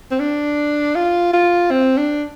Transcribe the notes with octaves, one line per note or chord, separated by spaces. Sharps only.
C4
D4
F4
F4
C4
D4